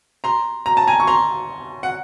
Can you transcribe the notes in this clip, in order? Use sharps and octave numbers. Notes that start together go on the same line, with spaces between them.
A#5 C6
A#5
A5
G#5 A#5
C#6
A#5 C6
F#5